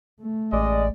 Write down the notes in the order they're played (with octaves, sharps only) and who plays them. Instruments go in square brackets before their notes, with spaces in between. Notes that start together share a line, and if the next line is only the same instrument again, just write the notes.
[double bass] A3
[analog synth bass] A1 [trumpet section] G#3 D#5 [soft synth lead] D5